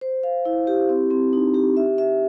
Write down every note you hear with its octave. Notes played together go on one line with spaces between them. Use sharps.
C5
F5
E4
G4
C4
C4
D#4
G4
E5
E5